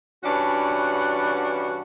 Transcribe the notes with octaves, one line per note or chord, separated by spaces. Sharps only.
G2 E3 C#4 D4 F#4 F#5